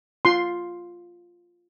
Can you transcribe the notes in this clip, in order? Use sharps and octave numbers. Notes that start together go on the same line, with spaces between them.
F4 C6